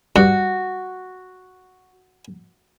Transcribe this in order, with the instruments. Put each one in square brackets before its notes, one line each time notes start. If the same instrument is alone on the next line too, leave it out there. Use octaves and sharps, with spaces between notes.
[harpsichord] G2 [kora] F#4